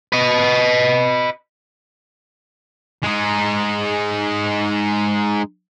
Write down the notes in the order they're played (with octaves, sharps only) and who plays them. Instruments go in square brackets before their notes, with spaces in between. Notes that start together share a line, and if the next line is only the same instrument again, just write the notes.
[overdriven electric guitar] B4 D#5
[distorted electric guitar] G#3 D#4